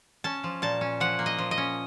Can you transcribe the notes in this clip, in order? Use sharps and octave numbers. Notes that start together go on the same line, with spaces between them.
C#4 A5
F3
A#2 A5
C#4
F3 F#5
A#3
D#5
F3
D#5
C#4